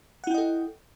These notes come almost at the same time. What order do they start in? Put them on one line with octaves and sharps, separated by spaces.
F#5 E4 G5 D#5 A4